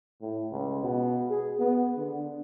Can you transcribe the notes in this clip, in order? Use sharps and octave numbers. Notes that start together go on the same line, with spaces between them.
A2
C#2
B2
G#4
B3
D3